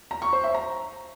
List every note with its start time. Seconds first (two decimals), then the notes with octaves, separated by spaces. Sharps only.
0.11 A#5
0.22 C#6
0.33 C5
0.44 E5
0.54 A#5